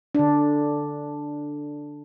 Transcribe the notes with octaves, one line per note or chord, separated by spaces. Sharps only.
D3 D4